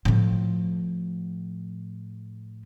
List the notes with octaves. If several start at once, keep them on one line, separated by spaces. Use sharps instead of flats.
A2 F3